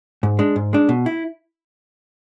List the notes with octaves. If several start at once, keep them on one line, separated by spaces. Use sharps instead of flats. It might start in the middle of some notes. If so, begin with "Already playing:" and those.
G#2
G#3 D4
G#2
G#3 D4
B2
E4